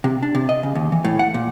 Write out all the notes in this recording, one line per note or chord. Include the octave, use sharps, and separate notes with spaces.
C3
D4
C3
D#5
C#3
D#2
E3
A2
F#5
A#2